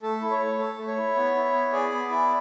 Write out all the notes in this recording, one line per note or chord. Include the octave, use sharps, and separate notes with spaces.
A3 A4
E4
C#5
A3
A4
A3
C#5
E4
B3
E4
B3
G#4 D5
B3
E4